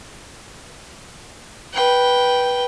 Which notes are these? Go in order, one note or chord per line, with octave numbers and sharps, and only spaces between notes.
B4 G5